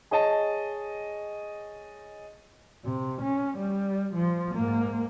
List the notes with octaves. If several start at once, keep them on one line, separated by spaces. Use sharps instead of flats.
G#4 C#5 D#5 A5
C3
C#4
G3
F3
G#2 A#3